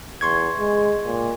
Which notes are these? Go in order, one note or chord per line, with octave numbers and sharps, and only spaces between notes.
E2 C6 C#6 G#6
G#3
A#2